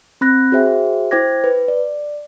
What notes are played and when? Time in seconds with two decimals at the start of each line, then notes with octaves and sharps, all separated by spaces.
0.21 C4 B5 F#6 A#6
0.52 F#4 G#4 C5 E5 G5
1.11 E4 C5 G5 D6 G#6 A#6
1.44 B4
1.68 D5